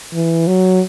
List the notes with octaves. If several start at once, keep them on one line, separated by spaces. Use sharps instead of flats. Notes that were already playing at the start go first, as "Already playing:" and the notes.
E3
F#3